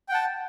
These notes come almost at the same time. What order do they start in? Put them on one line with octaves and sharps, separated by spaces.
G5 F#5 A5